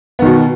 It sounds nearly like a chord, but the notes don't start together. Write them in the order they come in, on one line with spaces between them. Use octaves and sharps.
B3 D#3 B2